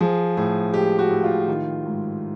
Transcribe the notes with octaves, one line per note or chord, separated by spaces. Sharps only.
F3 G#4
A2 G#4
G#3 G4
F#4
A2
F4
D#3
G#2